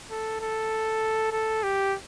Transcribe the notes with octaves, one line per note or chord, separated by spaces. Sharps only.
A4
A4
A4
G4